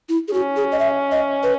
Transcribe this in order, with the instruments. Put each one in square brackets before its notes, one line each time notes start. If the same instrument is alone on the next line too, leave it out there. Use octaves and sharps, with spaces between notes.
[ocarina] E4
G#4
[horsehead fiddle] C#4 [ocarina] F#4
[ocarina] G#4
D#5
E5
D#5
B4